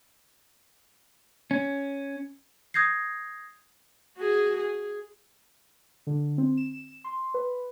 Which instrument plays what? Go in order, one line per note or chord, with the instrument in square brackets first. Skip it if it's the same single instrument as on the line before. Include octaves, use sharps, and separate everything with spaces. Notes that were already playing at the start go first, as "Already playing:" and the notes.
[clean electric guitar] C#4
[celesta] D#6 G6 G#6 A#6 C7
[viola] F#4 G#4
G#4
[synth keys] D3
C4
E7
C6
B4